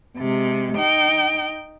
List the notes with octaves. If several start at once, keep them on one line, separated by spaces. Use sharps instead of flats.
C3 G#3
D#4 G5